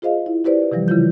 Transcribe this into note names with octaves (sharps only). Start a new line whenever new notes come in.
F4 G#4 C5 D#5 F5
E4
E4 G4 B4 C5 D5
C3 E3 F3 G3
C#3 E3 E4 F4 G6